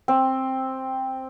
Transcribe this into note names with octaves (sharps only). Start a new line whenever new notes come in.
C4